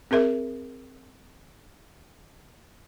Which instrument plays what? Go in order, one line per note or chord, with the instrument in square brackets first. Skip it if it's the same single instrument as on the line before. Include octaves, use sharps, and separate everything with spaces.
[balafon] C4 G#4 A#4 E5